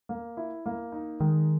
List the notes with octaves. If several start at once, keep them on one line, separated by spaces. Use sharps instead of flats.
A#3
E4
A#3
D#4
D#3 G#3